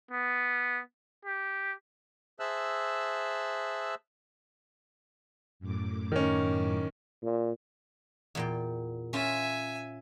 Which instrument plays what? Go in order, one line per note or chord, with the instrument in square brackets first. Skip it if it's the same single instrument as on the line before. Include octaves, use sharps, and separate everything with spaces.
[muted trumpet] B3
G4
[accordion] G#4 C5 E5 A5 E6 F#6
[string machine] F#2 A2 D6
[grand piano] D#3 C#4
[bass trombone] A#2
[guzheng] E2 A#2 G5
[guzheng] C#4 F4 [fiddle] E5 G#5